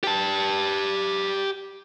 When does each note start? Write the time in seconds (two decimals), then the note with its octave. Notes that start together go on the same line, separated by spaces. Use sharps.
0.04 G4 A5